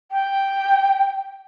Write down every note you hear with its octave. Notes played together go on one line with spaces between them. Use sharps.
G5